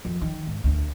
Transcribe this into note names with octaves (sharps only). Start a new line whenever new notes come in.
F2
D#3
G#2
D2